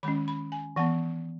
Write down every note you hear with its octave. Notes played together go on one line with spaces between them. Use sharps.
D#3 G#3 C#4 B5
B5
G#5
E3 B3 F#5